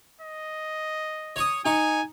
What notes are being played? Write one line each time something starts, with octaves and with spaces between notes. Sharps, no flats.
D#5
C#5 C#6 D#6
D#4 G#5 C#6